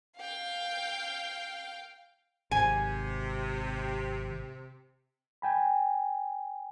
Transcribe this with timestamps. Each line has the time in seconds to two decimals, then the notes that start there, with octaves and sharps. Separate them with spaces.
0.17 F5 G5
2.51 G#1 C3 G#5
5.42 G5 G#5 B5